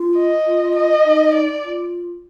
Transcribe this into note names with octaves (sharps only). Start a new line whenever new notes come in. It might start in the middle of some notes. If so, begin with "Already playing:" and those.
Already playing: F4
D#5
F4
D#5
D#4
D5
F4